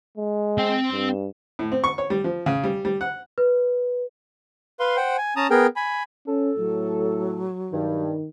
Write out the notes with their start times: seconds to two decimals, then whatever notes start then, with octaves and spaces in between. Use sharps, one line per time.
0.17 G#3
0.58 C4 G5
0.92 G2
1.59 A2
1.72 C4
1.84 C#6
1.98 C#5
2.10 G3
2.24 F3
2.46 C#3
2.64 G3
2.85 G3
3.01 F#5
3.38 B4
4.80 B4 F5 C6
4.97 C5 F#5 G5
5.18 G#5
5.36 C#4 A5 A#5 D#6
5.50 B3 G#4 A#4 G5
5.76 G#5 B5
6.27 C#4 A4
6.57 A2 F#3
7.72 G2 D#3